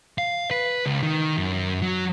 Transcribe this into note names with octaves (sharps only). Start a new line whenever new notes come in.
F5
B4
C#2
D#3
F#2
F#3